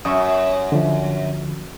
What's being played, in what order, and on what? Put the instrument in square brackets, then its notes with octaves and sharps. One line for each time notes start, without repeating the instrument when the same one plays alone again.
[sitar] F#2 [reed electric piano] E5 C#6 D#6
[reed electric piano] D3 F3